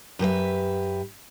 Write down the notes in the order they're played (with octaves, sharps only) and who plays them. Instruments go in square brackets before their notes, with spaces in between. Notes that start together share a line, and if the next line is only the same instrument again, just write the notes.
[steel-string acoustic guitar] F#2 G4 B4 E5